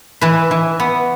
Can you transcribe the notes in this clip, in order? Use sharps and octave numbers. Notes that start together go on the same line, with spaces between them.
E3 B4
E3
B3